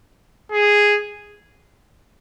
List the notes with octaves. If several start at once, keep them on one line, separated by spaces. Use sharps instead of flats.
G#4